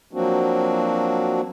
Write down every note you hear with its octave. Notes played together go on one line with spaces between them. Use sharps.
F3 F#3 A#3 C4 D4 F#4